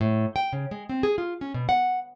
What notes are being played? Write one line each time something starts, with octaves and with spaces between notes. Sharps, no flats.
A2
G5
C#3
G#3
C4
G#4
F4
C#4
B2
F#5